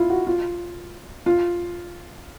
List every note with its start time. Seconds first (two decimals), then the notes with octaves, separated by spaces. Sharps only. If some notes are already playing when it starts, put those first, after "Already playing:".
Already playing: E4 F4
0.10 F#4
0.27 F4
1.26 F4